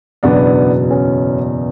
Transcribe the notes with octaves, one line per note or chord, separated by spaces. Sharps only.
F#1 E2 B2 F#3 B3 D4
C#4